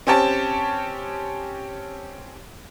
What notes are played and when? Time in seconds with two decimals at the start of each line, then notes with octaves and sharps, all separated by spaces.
0.07 C4 C#4 G4 C#5 A5